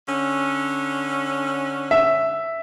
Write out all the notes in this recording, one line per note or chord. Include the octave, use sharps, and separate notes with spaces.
D3 C#4
E5